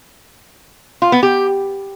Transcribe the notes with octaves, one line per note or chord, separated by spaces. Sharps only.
F4
B3
G4